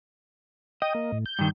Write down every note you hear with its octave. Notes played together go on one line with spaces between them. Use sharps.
D#5 G5 D#6
A#3
A2
G6
G2 D#3